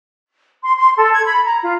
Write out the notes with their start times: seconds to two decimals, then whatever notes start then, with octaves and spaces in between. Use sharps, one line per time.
0.63 C6
0.77 C6
0.97 A4
1.12 G#6
1.26 B5
1.45 A#5
1.62 F4